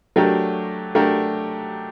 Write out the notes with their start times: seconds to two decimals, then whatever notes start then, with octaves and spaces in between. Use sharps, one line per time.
0.16 F#3 A3 D4 G4 A#4
0.95 F#3 A3 D4 G4 A#4